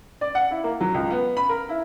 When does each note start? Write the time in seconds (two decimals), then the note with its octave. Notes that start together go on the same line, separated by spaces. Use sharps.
0.21 D5
0.35 F#5
0.51 E4
0.64 A#3
0.81 F#3
0.94 C#2
1.10 B3
1.37 B5
1.49 A#4
1.69 E4